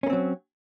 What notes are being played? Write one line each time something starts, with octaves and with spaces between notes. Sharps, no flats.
F#3 A#3 C4 C#4